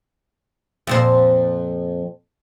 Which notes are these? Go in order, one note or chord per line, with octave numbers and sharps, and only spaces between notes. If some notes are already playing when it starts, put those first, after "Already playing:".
F2 A#2 C5